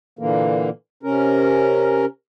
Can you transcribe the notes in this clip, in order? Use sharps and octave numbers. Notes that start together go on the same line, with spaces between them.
A#2 D3 E3 A#3
C3 C#4 A#4